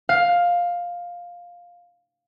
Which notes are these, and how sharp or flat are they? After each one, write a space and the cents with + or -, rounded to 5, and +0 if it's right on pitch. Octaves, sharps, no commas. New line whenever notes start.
F5 +10